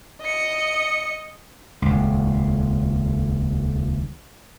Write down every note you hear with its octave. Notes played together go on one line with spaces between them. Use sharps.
D#5 C#7
D#1 C#2